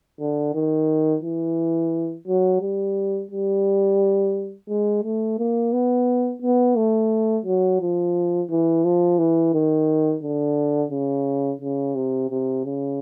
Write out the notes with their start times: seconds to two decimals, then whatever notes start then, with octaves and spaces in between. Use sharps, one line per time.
0.20 D3
0.55 D#3
1.23 E3
2.27 F#3
2.62 G3
3.31 G3
4.69 G#3
5.04 A3
5.39 A#3
5.73 B3
6.42 B3
6.77 A3
7.46 F#3
7.81 F3
8.50 E3
8.85 F3
9.19 E3
9.54 D#3
10.23 D3
10.91 C#3
11.61 C#3
11.95 C3
12.30 C3
12.65 C#3